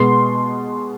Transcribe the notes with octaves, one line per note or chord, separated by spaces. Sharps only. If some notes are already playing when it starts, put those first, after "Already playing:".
Already playing: B2 G#3 B3 C6